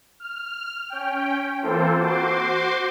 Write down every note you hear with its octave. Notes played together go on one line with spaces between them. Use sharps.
F6
C#4 G5
E3 A#3 C4 F4 A4 C5
F#4 C5 C6 D6